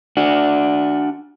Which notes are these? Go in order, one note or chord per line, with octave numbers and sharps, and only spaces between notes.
D4 F#4